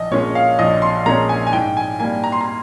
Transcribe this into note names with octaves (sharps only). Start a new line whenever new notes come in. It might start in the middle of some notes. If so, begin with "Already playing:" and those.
Already playing: A#1 D#5
A#2 G#3 C#4 C#5
F5
A#1 D#5
C6
A#2 G#3 C#4 A#5
G#5
G#5
G#2 G5
G#5
G3 A#3 G#5
A#5
C6
A#5